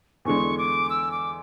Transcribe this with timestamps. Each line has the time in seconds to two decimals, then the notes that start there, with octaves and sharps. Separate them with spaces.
0.25 E2 D3 G#3 C#6
0.58 D6
0.90 E6
1.11 D6